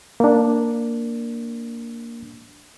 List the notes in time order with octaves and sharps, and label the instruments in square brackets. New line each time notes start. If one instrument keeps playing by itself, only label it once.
[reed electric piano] A#3 D4